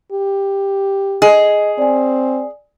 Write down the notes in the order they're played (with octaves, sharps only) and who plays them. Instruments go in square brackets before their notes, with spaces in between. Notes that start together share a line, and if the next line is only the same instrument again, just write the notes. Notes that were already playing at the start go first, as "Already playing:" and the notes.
[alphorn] G4
[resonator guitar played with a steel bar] G#4 [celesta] D#5
[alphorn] C4 [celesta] D5 G#5